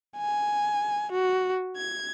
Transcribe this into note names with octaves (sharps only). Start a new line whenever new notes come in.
G#5
F#4
G#6